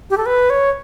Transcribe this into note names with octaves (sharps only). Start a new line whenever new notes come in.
G4
A4
B4
C#5